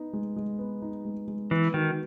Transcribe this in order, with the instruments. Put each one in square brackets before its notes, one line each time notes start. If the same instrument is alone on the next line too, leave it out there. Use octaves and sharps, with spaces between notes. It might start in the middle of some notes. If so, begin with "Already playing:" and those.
Already playing: [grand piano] B3 D#4
G#3
G#3
B3
D#4
G#3
G#3
[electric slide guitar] E3 [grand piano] B3
[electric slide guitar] D#3 [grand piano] F#4